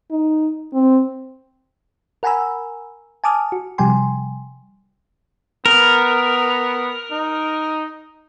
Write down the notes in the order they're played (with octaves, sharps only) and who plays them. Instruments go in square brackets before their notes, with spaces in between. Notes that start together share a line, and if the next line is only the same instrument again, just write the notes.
[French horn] D#4
C4
[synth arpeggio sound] A#4 F#5 G#5 A#5 B5 E6
G#5 A5 D6 D#6 F6
F#4
C3 F3 G3 G5 G#5 C6
[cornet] B3 [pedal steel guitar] A#4
[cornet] D#4